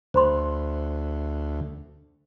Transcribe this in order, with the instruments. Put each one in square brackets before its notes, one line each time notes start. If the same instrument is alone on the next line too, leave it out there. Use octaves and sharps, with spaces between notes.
[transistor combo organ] D2 [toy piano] C5 B5 C6